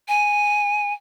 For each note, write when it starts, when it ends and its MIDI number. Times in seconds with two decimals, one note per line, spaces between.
0.08 0.93 80